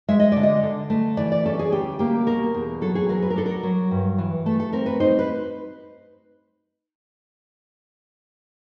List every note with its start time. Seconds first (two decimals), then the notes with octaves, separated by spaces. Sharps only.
0.08 G#3 E5
0.20 D#5
0.32 D3 D5
0.43 D#5
0.63 D3
0.90 A3
1.17 E3 D5
1.32 D5
1.45 C#4 A4
1.59 G#4
1.72 D2 G4
1.99 A#3 G4
2.26 B2 A#4
2.54 E2
2.81 F#3 A4
2.95 G#4
3.09 F#3 A#4
3.22 B4
3.30 A#4
3.36 D4 A4
3.46 A#4
3.63 F#3
3.91 G2
4.18 E3
4.46 A3 A4
4.60 A4
4.72 C4 A#4
4.86 B4
5.00 D#4 C5
5.19 B4